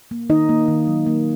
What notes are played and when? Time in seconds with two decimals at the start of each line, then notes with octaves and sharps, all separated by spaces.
0.11 A#3
0.29 D#3 D#4 D#5
0.49 A#3
0.68 D#3
0.87 F#3
1.07 A#3